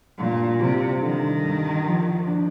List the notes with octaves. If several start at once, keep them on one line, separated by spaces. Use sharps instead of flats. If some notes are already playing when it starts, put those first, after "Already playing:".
G2 A#2
C3 G3
D3 D#3
G2
F3
D4